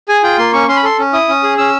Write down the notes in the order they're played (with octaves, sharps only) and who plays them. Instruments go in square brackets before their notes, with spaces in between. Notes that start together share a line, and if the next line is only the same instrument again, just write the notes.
[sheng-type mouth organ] G#4 G#5
F4 G5
A#3 C6
C#4 C#6
C#4 C6
B5
A4 C6
C#4
E4 D#6
C#4
G#4
C#4 E6